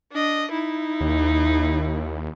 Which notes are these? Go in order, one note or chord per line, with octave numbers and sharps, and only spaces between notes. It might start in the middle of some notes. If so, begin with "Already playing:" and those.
D4 D#5
D#4 E4
D#2